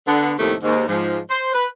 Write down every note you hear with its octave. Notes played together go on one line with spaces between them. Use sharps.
D3 B3
D#2 A2 C3 D#3 F3 A3
D#2 G#2
G#2 F3
C5
B4